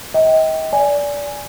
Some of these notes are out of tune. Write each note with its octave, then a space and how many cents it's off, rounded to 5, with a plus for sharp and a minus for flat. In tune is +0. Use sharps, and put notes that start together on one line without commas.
D#5 +35 G5 +0
D5 -25 G#5 +0